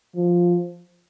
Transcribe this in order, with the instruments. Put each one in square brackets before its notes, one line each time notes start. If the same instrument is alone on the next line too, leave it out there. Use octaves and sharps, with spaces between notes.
[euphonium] F3